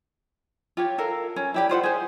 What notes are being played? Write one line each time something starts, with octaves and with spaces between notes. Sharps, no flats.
F4 G4 C#5
A4 A#4 F5
C#4
E4 G4 D5
F4 C5 D5 F#5
G#4 C5